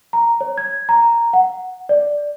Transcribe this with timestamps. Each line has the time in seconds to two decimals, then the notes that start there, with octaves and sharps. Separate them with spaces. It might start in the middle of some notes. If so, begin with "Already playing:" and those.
0.13 A#5
0.41 C#5
0.58 G#6
0.89 A#5
1.33 F#5
1.89 D5